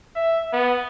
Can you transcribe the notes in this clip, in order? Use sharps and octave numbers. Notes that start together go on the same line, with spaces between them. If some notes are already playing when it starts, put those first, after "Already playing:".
E5
B3